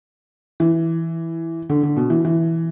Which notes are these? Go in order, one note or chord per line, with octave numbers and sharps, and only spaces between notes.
E3
D3
D3
B2
E3
E3